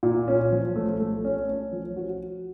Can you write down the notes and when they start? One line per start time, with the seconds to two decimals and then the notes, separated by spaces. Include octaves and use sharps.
0.03 A#2
0.28 C#4
0.52 F3
0.76 A3
1.00 A3
1.25 C#4
1.48 C#4
1.72 F3
1.96 F#4